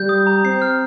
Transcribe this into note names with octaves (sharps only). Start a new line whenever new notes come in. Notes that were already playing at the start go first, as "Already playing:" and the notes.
Already playing: G3 G6
D#6
A#5
C4 C7
F6